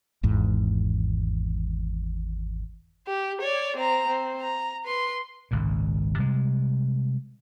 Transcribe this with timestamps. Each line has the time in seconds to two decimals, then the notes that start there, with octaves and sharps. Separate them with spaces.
0.23 G#1 E2 G#2
3.07 G4
3.41 C#5 D5
3.77 C4 A#5
4.07 C4
4.41 A#5
4.85 B4 C6
5.51 G#1 C#2 A#2
6.18 C3 G3 G#3